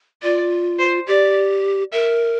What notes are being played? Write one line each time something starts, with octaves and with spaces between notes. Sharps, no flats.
F4 D5
C5
G4 D5
A#4 E5